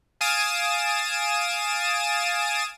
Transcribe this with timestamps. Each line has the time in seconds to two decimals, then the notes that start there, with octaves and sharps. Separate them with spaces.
0.21 F5 G#5 D#6 A6 D7 E7